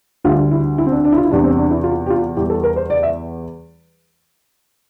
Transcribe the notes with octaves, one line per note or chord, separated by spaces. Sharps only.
D2 D3 G3 F4
E4
E4
C4
D4
D4
E4
F4
E4
E2 C3 G3 D4
C4
D4
E4
F4
G4
F4
E2 E3 G3 G4
A4
A#4
C5
D5
E5